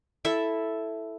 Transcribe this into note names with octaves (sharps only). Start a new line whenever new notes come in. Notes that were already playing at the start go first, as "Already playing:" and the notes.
E4 A4 E5